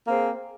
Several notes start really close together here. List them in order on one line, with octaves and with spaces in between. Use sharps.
A#3 C4 G#4